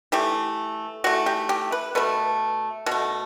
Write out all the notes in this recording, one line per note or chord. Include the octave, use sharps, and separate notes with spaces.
E3 A3 G4
E3 A3 F#4
G4
G4
B4
B2 A3 B4
B2
A3